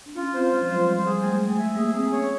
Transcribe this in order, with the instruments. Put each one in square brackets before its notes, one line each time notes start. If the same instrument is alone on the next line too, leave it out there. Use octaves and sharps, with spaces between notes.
[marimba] D4
[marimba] C#4 [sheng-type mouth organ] F4
[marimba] C4 [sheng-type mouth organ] C5
[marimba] G#3 [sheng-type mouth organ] F4
[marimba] F3
[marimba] F#3 [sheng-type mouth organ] C5
[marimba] G3 [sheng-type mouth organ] C5
[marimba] G3
[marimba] G#3 [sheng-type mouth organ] G#4
[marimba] A3 [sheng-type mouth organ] G#5
[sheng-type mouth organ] G#5
[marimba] A3
[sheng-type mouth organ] E5
[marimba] A#3 [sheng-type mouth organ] G#4
[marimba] C4 [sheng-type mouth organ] G#4
[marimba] C#4 [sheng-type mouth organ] C#5